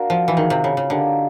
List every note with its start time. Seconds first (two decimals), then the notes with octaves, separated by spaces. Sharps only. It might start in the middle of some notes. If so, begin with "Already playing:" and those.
Already playing: A#3 D4 F#4 A#4
0.10 F3
0.28 E3
0.36 D#3 C4 F4 G#4
0.50 C3
0.64 C#3
0.77 C#3
0.90 D3 A#3 D#4 G4